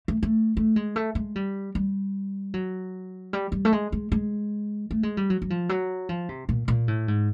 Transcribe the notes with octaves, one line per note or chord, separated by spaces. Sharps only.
A3
A3
A3
G#3
A3
G#3
G3
G3
F#3
G3
G3
A3
G#3
G#3
G#3
A3
G#3
G3
F#3
F#3
F3
F#3
F3
C3
A#2
A#2
A2
G#2